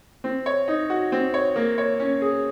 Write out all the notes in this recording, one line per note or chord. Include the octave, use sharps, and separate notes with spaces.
C4
C#5
D#4
F#4
C4
C#5
A#3
C#5
C#4
G#4